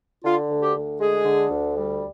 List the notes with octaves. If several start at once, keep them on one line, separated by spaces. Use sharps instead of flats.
D3 F4
D2
G4
D2
G#3 G#4
D3
D2
G3